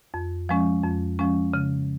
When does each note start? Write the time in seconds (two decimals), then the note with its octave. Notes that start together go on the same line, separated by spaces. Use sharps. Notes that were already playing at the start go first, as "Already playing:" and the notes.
0.14 F2
0.49 F3 G#3 C#4
0.84 F2
1.19 F3 G#3 C#4
1.54 C#3